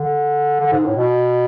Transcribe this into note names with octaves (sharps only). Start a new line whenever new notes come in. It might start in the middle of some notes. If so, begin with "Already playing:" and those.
Already playing: D3
D3
G#2
A2
B2